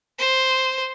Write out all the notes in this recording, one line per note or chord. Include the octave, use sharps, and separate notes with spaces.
C5